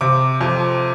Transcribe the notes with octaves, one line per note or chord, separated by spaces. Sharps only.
C3 D6
F2